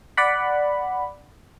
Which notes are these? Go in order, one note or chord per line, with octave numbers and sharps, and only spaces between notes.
D5 F#5 B5